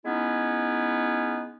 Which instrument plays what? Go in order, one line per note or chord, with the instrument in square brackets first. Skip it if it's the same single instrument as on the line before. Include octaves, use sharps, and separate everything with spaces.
[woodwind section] G#3 B3 C#4 D#4 E4